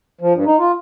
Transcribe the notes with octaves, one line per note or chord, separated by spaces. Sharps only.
F3
G2
D#4
F4